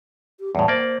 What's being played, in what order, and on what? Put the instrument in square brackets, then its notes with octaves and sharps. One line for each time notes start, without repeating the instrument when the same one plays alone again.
[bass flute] G4
[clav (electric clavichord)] E2 A2 [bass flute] G3
[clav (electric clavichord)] A#3 D5 [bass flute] C5